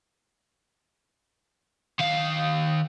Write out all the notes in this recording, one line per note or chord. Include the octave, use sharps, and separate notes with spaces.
D#3 F5